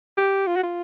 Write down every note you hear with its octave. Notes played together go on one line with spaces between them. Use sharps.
G4
F4
F#4
F4